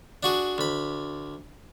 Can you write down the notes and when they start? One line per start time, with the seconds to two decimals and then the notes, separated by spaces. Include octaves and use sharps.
0.23 D4 F#4 G#4
0.58 D2 B5